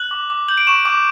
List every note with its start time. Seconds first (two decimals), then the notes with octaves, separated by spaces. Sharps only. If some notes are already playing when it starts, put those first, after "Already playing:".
Already playing: F#6 F#7
0.11 D6
0.30 D6
0.48 G6 F#7
0.58 D7
0.67 C#6 E7
0.85 D6